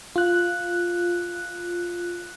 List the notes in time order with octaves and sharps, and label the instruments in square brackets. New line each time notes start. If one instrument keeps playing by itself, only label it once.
[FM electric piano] F4 F#6